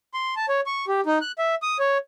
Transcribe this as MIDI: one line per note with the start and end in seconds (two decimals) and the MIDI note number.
0.14 0.35 84
0.36 0.46 81
0.49 0.61 73
0.66 0.85 85
0.88 1.01 67
1.06 1.18 63
1.21 1.32 90
1.38 1.55 76
1.62 1.77 87
1.79 1.98 73